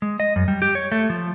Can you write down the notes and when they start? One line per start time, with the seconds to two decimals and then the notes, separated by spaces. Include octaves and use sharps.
0.02 G#3
0.20 D#5
0.36 F#2
0.48 G3
0.62 G4
0.75 C#5
0.92 A3
1.10 F3